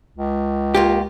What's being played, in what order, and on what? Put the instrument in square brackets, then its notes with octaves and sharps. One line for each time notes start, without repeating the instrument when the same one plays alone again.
[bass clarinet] C#2
[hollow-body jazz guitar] A#3 F4 G4